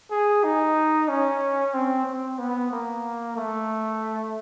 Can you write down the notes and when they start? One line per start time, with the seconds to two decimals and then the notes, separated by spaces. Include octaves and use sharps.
0.11 G#4
0.44 D#4
1.09 C#4
1.74 C4
2.07 C4
2.39 B3
2.72 A#3
3.36 A3